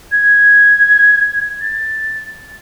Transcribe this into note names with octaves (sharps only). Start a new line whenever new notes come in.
G#6
A6